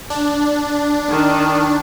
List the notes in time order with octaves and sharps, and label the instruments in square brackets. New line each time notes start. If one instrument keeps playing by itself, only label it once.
[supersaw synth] D4
[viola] D#3